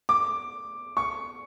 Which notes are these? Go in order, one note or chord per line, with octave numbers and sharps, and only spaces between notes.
D6
C#6